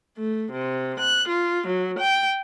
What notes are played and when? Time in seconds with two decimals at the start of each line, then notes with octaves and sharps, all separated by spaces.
0.18 A3
0.52 C3
1.00 F#6
1.29 F4
1.67 F#3
1.99 G5